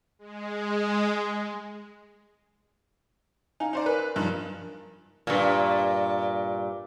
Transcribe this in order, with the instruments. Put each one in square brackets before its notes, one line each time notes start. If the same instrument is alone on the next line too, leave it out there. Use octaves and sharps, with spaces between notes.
[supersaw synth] G#3
[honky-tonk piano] D#4 [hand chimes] F5 G#5
[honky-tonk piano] D#4 C5 D5
[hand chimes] A#4 [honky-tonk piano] B4
[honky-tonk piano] G2 F3 D#4
[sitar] G2 A#2